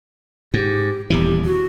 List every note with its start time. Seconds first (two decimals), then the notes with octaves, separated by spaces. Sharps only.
0.54 G#2 G4
1.10 D#1 E2 E3 G4
1.45 F#4